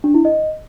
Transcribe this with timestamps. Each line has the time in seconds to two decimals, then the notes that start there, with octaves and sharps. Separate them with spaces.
0.04 D4
0.14 E4
0.25 D#5